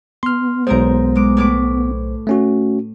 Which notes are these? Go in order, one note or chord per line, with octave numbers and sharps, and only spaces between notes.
B3 C6 F6
B1 G#2 A#4 C5 A#5
G#3 D6
A2 B4 D6
A3 C#4 F#4